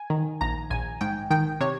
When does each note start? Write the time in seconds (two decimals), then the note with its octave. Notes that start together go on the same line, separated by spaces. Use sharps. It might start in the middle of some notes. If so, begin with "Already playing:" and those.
Already playing: G#5
0.10 D#3
0.41 A#1 A#5
0.70 A#1 G#5
1.01 G#2 G5
1.30 D#3 G5
1.60 C3 C#5